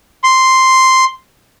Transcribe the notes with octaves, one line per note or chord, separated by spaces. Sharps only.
C6